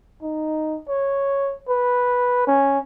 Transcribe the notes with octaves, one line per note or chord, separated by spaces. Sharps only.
D#4
C#5
B4
C#4